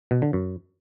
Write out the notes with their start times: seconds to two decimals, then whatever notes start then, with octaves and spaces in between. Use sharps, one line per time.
0.11 B2
0.22 D3
0.33 F#2